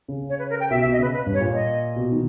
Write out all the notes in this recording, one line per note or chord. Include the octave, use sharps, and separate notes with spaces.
C#3
C#5
B4
A#4
G5
B2 E5
E5
B2
D#5
C#3 B4
B4
G2
C#5
A#2
D#5
B2
D#3